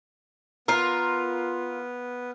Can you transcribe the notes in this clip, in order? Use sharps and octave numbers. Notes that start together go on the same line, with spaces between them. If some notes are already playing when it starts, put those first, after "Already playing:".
B3 F4 A#4 F5